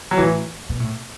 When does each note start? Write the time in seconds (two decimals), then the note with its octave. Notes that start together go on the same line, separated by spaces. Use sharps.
0.11 F#3
0.18 A2 E3
0.69 B2
0.80 A2